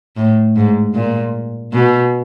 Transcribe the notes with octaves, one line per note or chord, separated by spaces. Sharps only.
A2
G#2
A#2
B2